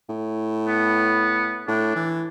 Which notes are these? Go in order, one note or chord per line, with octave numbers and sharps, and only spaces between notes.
A2
B3
A2 D4
E3